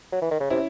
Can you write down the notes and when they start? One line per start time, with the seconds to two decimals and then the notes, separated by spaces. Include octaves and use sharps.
0.12 F#3
0.22 E3
0.31 D#3
0.40 C#3
0.50 C3 C#4 E4